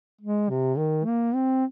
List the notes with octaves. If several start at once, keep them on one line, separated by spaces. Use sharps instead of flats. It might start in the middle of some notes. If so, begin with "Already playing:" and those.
G#3
C3
D#3
A#3
C4